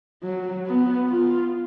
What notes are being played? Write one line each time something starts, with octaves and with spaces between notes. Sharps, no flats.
F#3
B3
F4